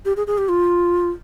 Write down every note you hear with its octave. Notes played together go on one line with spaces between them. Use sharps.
G4
G#4
G#4
G4
F4